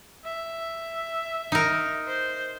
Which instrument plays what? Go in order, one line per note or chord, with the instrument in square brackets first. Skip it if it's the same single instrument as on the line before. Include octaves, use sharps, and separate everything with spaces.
[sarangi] E5
[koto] D#4 A#4
[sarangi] C5